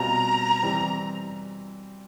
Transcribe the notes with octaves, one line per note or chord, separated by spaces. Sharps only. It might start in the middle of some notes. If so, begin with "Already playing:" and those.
Already playing: B2 G3 C4 F4 A#5
E3 G3 C4